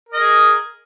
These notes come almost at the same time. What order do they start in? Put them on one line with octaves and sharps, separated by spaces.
A#4 D#5 G#4